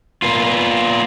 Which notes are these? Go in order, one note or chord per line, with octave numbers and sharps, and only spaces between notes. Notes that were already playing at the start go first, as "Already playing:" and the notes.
A#3 B3 F4